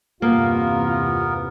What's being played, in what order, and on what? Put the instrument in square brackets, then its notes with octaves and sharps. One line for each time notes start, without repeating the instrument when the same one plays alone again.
[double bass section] G1 E2 C3 [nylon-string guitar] A#3 [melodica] B3 A#4 [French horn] F4